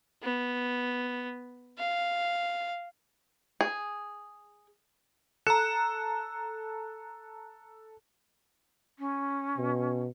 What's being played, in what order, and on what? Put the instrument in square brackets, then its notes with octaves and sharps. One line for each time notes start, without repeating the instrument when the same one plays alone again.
[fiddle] B3
F5
[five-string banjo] G#4
[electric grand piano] A4 C#7 E7 [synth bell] A#5 F#6
[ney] C#4
[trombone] B2